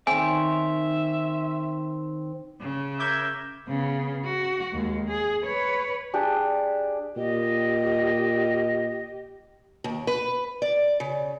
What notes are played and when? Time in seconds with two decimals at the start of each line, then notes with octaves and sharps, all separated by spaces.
0.07 D#3 C4 C#5 D5 E5 G#5
2.60 C#3
3.00 A#4 E5 D6 G6 G#6
3.68 C#3 B3
4.25 F#4
4.73 D#2 G#3
5.09 G#4
5.46 B4 C#5
6.14 D4 G4 G#4
7.17 A#2 G4 D#5
9.84 D#2
10.07 B4
10.62 D5
11.00 C#3